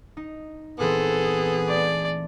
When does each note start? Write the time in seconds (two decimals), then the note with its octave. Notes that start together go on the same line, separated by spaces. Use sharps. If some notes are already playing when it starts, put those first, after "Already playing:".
0.17 D#4
0.79 A#2 E3 B3 C4 G#4 A4
1.68 A3 D5